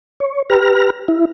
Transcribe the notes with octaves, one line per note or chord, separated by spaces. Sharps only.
C#5
G4 B4 A#5 F6
E4